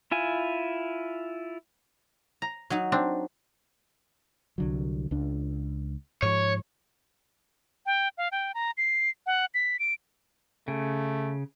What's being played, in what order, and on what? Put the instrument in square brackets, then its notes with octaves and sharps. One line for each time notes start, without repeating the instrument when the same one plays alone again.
[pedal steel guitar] E4 F4 G#5
[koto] A#5
[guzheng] F#3 D#4
[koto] C4 D4
[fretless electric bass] C2 D3 F#3
C#2 D4
[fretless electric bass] G#2 F3 [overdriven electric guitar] C#5
[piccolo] G5
F5
G5
A#5
C7
F#5
B6
D7
[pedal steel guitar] C#3 [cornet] A3